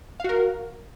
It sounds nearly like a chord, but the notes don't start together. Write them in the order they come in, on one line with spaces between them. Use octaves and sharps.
F5 F#4 A#4